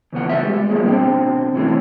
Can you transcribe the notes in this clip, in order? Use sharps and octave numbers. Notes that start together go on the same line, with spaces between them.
E2 C#3 B3 F#5
A4 B4 E5
G#3 G4
F3 G3 A3 A#3 G#4 D#5
B2 D3 C4 G5
C3 E3 G#3 A3 C#4